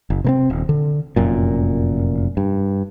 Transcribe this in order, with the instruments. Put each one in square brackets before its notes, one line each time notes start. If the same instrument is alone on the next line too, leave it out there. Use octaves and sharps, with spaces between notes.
[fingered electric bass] F#1
C3 A#3 C4
D#1
D3
F1 F#2 A#2
G2